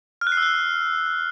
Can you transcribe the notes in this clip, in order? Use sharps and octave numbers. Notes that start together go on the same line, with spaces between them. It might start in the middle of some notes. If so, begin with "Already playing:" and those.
F6
F#6
C7
E6
F#6